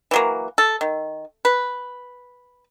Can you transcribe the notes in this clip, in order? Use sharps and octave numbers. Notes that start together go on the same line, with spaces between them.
E3 F#3 A#3
A4
D#3
B4